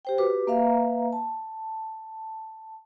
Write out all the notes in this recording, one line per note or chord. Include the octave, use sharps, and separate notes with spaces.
G4 C5 G5
F#4 G4 B4 D6
A#3 B4 E5 F5 A#5
A5